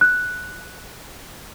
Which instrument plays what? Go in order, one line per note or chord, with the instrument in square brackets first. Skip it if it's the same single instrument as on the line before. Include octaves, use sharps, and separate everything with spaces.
[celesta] F#6